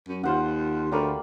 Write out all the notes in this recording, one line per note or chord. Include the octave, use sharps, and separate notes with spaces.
F#2
D#2 F4 C5 F#5
D2 G3 A#3 B5